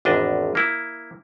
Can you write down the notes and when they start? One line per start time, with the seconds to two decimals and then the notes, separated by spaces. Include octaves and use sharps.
0.05 G#1 E2 D4 D#5
0.55 A#3 E4